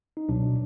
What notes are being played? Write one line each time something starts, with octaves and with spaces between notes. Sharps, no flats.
D#4
C#2 B2 F#3 D4